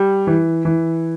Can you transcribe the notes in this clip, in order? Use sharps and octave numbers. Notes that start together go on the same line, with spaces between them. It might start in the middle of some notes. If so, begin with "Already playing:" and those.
Already playing: G3
E3
E3